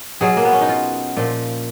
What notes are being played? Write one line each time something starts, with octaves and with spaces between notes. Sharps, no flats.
B2 F#3 G#4
A#3
B3
C#4
D#4
F4
A#2 F3